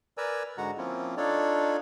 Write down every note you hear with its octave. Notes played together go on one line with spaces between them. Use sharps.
A#4 B4 D5 G#5 A#5 E6
G#2 D3 G#3 F#4 F#5 A#5
F3 A#3 C4 C#4 E4 F4
D4 D#4 F4 A4 C#5 D5